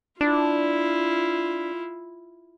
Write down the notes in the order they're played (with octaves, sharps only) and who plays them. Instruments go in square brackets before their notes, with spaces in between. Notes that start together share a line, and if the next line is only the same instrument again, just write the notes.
[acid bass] D4 [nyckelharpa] E4 F4